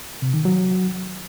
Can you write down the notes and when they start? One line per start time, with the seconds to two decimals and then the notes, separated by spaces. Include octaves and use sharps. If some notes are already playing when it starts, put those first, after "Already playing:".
0.22 C3
0.34 D#3
0.45 F#3